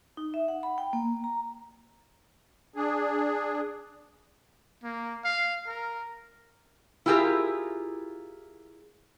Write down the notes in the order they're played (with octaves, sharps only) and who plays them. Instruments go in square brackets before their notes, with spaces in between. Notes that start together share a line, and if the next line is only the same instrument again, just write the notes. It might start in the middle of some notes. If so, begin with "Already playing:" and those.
[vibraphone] D#4
E5
F#5
B5
G5
A#3
A#5
[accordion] D4 G#4
[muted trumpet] A#3
F5
A#4
[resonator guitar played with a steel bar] E4 F4 G4 G#4 A#4